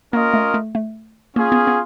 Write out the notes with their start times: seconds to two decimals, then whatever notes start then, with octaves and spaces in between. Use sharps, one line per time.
0.13 A#3 C#4 F4 A#4 D#5
0.34 A3
0.54 A3
0.75 A3
1.36 A#3 C#4 F4 G#4
1.52 B3
1.67 B3